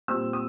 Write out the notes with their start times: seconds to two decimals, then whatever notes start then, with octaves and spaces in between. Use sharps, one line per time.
0.08 A#2 G3 C4 E6
0.33 D#6